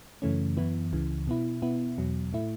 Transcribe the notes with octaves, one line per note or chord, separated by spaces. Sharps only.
F#2 C#3 E3 A3 C#4
F#2 E3 B3 E4
C#2 C#3 E3
B2 B3 E4
B2 B3 E4
E2 B2 F#3
A2 A3 E4